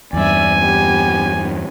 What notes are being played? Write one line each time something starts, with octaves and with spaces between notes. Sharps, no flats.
E2 G2 D5 E5 G#5
B3 G4